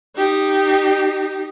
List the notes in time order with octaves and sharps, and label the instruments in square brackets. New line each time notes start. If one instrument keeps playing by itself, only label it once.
[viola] D#4 G4